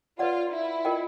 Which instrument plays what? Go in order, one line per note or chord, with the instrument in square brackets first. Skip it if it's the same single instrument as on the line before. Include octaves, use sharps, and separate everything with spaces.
[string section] F4 [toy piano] B4 D5 F#5
[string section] E4
[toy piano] F4 A#4 D#5 G5